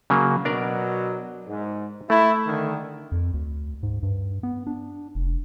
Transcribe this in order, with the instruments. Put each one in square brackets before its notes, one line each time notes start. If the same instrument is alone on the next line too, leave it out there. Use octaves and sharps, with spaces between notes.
[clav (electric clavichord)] C#3 F#3 A#3
[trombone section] B2 F#3 [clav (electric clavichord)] D4 A#4 D5
[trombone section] G#2
[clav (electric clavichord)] A3 [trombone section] E4
[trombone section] D3 D#3
[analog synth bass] F2
D2
G#2
G2
B3
D4
F1